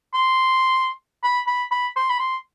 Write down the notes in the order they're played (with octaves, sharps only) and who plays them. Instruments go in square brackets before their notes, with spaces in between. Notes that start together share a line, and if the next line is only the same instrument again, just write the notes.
[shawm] C6
B5
B5
B5
C6
B5
C6